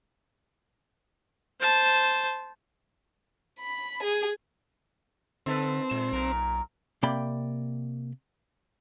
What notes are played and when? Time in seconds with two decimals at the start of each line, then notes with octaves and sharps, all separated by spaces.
1.60 C5 A5
3.60 B5
4.03 G#4
5.46 D3 C4 D#4 A4 B4
5.91 A#2 G#3
6.12 B1 A#2 A#4
7.03 C3 A#3 D5 G5 B5